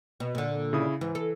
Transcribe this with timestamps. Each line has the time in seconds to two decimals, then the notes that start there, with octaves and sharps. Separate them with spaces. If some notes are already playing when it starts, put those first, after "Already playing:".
0.20 B2
0.35 A#2 D3
0.73 C#3 E4 D#6
1.01 G#2 E3
1.15 A4